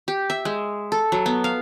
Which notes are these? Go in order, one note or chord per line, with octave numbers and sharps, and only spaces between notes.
G4
E5
G#3
A4
F#3
B3
F5